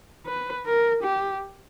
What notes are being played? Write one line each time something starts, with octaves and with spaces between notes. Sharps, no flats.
B4
A#4
G4